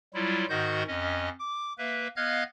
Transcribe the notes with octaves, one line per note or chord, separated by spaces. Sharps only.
F#3 G3 E4 F4
G#2 D#3 F#4 D#5 F#5 G6
F2 C#4 D#5
D6
A#3 B4 E5
B3 D#5 F5 F6 F#6 G#6